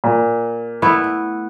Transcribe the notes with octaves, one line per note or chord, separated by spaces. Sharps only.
A#2
A3 B3 E4